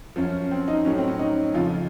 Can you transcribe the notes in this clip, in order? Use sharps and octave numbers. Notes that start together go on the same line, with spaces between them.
F#2 F3 C#4
C4
D#4
A2 F#3 C#4
C4
C#4
D#4
F2 C#3 F3 F4